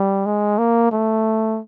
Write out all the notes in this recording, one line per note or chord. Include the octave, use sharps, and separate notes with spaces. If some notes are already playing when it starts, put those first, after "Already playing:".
Already playing: G3
G#3
A#3
A3